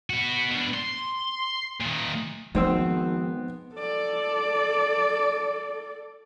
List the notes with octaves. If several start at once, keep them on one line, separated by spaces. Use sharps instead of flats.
B3 F#4
B2 D4
C6
A#2 D#3
G#1 D#3 F3 B3 C4 E6
A4 D5